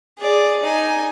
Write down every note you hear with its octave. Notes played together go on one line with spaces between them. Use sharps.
G#4 D5
D#4 G#5